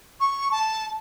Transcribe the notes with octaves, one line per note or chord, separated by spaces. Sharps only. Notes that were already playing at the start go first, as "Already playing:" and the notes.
C#6
A5